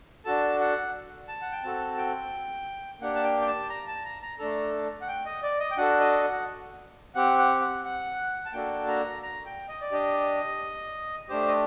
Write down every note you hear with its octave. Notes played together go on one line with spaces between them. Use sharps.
D4 F#4 A4 A5
F#5
A5
F#5
G5
C4 F#4 A4 A5
G5
A#3 D4 G4 F#5
A5
G5
G5
A5
A#5
A5
A#5
A#5
A3 D4 A4 A#5
F#5
G5
D#5
D5
D#5
G5
D4 F#4 A4 F#5
D#5
F#5
C4 G4 F#5
F#5
F#5
F#5
A5
A#3 D4 F#4 A4 G5
A#5
A#5
G5
D#5
D5
D4 G4 D#5
A3 D4 G4 C5
D#5